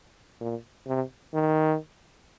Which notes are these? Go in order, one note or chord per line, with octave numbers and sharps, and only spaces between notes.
A#2
C3
D#3